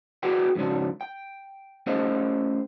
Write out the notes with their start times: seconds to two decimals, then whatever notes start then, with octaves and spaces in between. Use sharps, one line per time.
0.23 F#4 G#4 B4 D5 F#5 G5
0.55 F2 G#2 C#3 F#3 D4
1.01 G5
1.86 A3 C#4 G#4 C5 D#5 F5